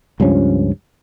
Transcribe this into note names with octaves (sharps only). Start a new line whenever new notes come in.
C#2 G2 F3 C#4